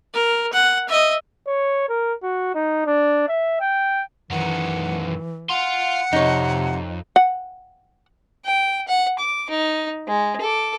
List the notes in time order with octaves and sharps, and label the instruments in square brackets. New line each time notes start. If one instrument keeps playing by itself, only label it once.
[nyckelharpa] A#4
F#5
D#5 E5
[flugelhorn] C#5
A#4
F#4
D#4
D4
E5
G5
[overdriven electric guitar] F#2 D#3 [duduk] E3 [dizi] F#5
[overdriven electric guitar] F5 C6 [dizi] F#5
[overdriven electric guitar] F2 [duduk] C3 [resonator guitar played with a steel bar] D#4 C#5
[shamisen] F#5
[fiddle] G5
F#5
D6
D#4
G#3
A4 D6